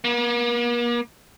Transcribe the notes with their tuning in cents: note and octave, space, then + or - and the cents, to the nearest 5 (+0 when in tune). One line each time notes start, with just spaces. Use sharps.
A#3 +45